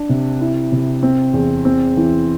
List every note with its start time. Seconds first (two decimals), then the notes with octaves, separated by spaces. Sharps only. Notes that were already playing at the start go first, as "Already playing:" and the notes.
Already playing: D4
0.09 C3
0.41 E4
0.72 C3
1.03 C4
1.34 E2
1.65 C4
1.97 E3